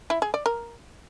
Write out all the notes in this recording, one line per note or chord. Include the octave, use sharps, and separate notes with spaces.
E4
G#4
D5
A#4